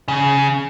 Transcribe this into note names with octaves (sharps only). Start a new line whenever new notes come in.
C#3